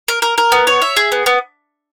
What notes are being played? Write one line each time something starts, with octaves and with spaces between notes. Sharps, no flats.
A#4
A#4
A#4
B3
C#5
E5
G#4
B3
B3